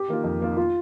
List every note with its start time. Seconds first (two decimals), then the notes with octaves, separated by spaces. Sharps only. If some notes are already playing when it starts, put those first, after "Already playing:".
Already playing: G4
0.08 D#3 A#3 F4
0.24 F2
0.40 D#3 A#3 F4
0.57 F4